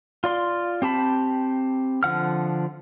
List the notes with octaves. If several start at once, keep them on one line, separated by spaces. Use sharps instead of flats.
F4 D5 C6
C4 G4 A5 B5
D3 F3 F#5 F6